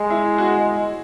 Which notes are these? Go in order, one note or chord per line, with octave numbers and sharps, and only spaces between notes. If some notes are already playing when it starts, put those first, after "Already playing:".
Already playing: G#3 G#4
E4
F#4